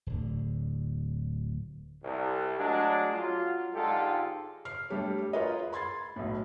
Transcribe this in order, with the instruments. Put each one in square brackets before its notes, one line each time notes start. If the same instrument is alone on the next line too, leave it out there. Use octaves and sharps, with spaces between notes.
[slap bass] D1 D3
[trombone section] C2
F#3 G#3 A3 D4
F#3 F4
G#2 D3 G#3 F4 G4 A4
[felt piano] F6 C7
G3 A3 D4 G4 C#5
F4 G#4 A#4 B4 C#5 D#5
B5 C6 G#6 A6 C7
B1 A2